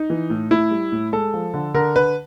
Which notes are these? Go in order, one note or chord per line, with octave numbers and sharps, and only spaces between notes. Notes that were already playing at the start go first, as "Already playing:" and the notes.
Already playing: D#4
E3
A2
A2 E4
G3
A2
G#3 A4
F3
D3
D3 A#4
D3 B4